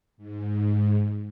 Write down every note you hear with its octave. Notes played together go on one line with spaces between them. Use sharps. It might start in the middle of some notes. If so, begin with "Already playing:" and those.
G#2